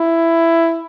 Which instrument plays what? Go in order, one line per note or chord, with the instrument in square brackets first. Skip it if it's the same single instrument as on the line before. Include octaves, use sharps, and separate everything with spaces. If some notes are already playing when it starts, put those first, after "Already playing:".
Already playing: [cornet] E4